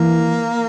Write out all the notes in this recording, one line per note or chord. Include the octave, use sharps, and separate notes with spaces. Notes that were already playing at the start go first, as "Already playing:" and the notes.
Already playing: E3 A#3